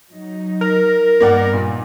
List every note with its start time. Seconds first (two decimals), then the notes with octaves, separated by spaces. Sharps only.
0.10 F#3 D#4
0.61 A#4
1.21 G2 A#3 B3 D#4 D5 F#5
1.53 A#2